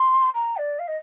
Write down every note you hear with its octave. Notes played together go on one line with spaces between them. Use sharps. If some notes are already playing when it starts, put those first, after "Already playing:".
Already playing: C6
A#5
D5
F5
D#5